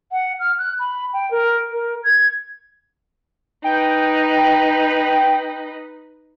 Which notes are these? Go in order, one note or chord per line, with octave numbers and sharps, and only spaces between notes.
F#5
F6
F#6
B5
G5
A#4
A#4
G#6
D#4 B4 G5